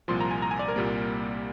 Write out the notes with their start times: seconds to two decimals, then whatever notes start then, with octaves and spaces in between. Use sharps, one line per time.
0.08 C2 A#2 F3 C6
0.20 A#5
0.31 G#5
0.42 A#5
0.51 G#5
0.59 D5
0.68 A#4
0.76 C2 A#2 G3 A#3